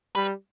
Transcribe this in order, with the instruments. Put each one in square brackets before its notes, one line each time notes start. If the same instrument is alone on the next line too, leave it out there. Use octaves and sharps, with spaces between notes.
[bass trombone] G3 [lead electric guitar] B4